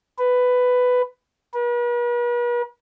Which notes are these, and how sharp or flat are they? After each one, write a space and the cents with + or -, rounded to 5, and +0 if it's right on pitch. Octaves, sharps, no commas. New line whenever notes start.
B4 +10
B4 -45